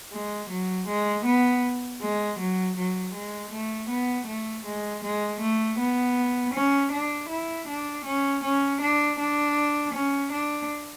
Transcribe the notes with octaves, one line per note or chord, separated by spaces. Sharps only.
G#3
F#3
G#3
B3
G#3
F#3
F#3
G#3
A3
B3
A3
G#3
G#3
A3
B3
C#4
D4
E4
D4
C#4
C#4
D4
D4
C#4
D4